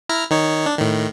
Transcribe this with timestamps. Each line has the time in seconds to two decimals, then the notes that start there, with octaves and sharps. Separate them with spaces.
0.09 E4 A#5 F6
0.31 D#3 D#4 C#5
0.66 D4
0.79 A2 D#3